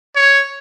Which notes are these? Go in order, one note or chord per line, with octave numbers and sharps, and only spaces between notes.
C#5